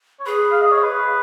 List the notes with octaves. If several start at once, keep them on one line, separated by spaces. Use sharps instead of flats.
C#5
G#4 B4
F5
D#5
C#5
B4